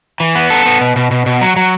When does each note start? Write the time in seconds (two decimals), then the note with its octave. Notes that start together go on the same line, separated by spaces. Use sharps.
0.20 E3
0.35 B3
0.50 A4
0.66 B3
0.81 B2
0.96 B2
1.11 B2
1.26 B2
1.41 F#3
1.56 F#3